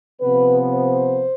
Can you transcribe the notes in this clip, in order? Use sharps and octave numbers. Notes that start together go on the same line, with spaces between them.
C3 F3 B3 B4
C5